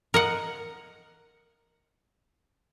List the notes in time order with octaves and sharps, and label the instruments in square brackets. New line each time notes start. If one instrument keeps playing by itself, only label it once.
[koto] A#4 D#5 F#5